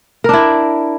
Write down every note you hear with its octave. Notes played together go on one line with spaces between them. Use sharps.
D4 E4 A#4